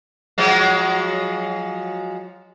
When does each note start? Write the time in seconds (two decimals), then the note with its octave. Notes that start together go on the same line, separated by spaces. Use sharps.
0.38 F3 F#3 G#3